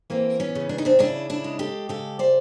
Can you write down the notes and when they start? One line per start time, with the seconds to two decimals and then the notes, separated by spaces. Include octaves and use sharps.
0.10 E3 A#3 C4
0.40 B3 C#4
0.55 C#3
0.69 D4
0.78 D#4
0.85 C4 D4
0.99 C#3 D4 E4
1.30 D4 E4
1.44 G#3
1.59 G4 A4
1.89 C#3 G4 A4
2.19 C5 D5